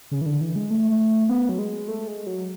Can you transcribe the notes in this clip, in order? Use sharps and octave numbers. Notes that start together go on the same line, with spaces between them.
C#3
E3
D3
E3
G#3
A3
B3
F#3
G#3
A3
G#3
F#3